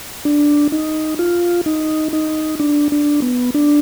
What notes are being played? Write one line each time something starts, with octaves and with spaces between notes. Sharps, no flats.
D4
D#4
F4
D#4
D#4
D4
D4
B3
D4